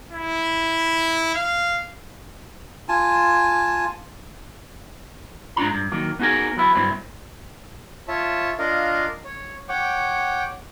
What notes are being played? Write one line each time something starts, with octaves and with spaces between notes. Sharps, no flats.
E4
F5
F4 G#5 A5
G#2 D4 F4 A#5
G2
D#3 F#3 A#3
B3 D#4 F#4 G#4 A#4
F#3 B3 E4
G2 B2 F#3 C4 E4
F4 C#5 E5 A5
D4 F4 A#4 D#5 F5
C#5
C#5 F#5 G5 D6